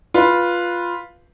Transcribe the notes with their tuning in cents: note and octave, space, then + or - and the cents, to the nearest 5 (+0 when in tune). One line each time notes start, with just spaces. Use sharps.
F4 +0 B4 -10